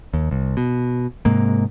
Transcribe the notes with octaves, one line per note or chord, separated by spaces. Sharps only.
D#2
C2
B2
G#2 C3 G#3 A#3